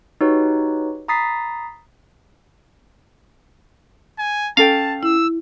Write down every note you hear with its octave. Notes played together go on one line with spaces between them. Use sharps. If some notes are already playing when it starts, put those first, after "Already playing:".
D#4 F#4 G4 B4 C#5
A#5 B5 D#6 A6 B6 C7
G#5
C#4 A4 F5 G5 A5
E4 E6